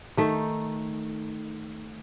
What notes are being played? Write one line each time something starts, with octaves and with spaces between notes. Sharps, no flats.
D#3 A3 D#4